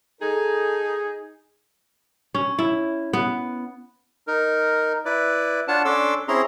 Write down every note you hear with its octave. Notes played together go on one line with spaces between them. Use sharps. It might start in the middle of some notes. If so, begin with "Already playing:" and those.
D#4 G#4 A4
C#4
E4
B3
D#4 A#4
E4 B4 D5
D4 F4 C#5 F#5 A5
C#4 D4 A4 C6 D6 E6
C4 C#4 E4 G#4 A#5 C6